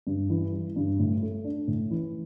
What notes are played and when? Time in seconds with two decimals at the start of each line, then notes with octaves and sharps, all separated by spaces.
0.07 G2
0.30 E3
0.52 G3
0.76 G2
0.99 A2
1.22 A3
1.44 D4
1.68 A2
1.91 E3